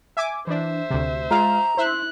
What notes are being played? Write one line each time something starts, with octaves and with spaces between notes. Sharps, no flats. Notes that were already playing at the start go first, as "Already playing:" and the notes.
E5 G#5 D6
E3 D4 C5 E5
D2 C3
G#3 F4 F5 A#5
E4 C5 E5 F#6